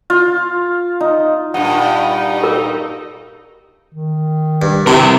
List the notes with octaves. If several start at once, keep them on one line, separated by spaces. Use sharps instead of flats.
F4
D#4
G2 A#2 G3 D#4 F#5
A#4
D#3
G2
C3 E4 A#4